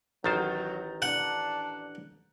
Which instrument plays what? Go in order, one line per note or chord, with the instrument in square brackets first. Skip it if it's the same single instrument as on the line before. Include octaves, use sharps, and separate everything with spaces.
[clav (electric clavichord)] A1 D#3 C5 [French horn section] F#3 [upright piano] A#5 G6 A6
[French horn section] D4 [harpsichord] F#5